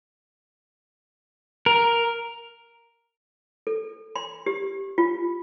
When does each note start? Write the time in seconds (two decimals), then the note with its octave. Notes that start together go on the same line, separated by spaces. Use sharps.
1.66 A#4
3.67 A4
4.16 C6
4.46 G4
4.98 F4